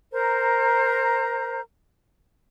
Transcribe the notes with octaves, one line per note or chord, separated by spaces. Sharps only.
A#4 C5 A#5